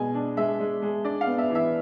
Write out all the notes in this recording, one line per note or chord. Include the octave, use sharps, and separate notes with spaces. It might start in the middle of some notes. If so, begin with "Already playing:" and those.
Already playing: B2 G#3 G#5
D4
G#3 E5
G#3
G#3
D4 D5
F5
B3
E5
E3
E5